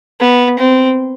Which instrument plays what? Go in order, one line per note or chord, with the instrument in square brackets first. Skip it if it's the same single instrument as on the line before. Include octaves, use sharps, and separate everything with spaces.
[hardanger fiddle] B3
C4